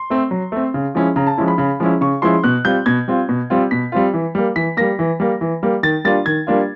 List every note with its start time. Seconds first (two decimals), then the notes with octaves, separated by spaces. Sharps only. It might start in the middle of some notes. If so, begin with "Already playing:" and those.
Already playing: C6
0.10 A3 C4
0.31 F#3
0.52 A3 C4
0.74 C#3
0.95 F3 G#3 C#4 E4
1.16 C#3 A#5
1.27 A5
1.37 F3 G#3 C#4 E4
1.48 B5
1.58 C#3 B5
1.80 F3 G#3 C#4 E4
2.01 C#3 C#6
2.22 F3 G#3 C#4 E4 C6
2.44 B2 F#6
2.65 G3 C4 F4 G6
2.86 B2 G#6
3.08 G3 C4 F4
3.29 B2
3.50 G3 C4 F4
3.71 B2 B6
3.92 G3 C4 F4
4.13 E3
4.35 G3 A#3
4.56 E3 B6
4.77 G3 A#3 A#6
4.99 E3
5.20 G3 A#3
5.41 E3
5.63 G3 A#3
5.83 D#3 A6
6.05 G3 A#3 D4 F4 A6
6.26 D#3 G#6
6.47 G3 A#3 D4 F4